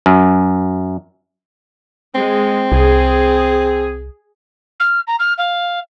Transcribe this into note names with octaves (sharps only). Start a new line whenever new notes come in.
F#2
G#3 C4
C2 G#4
F6
A#5
F6
F5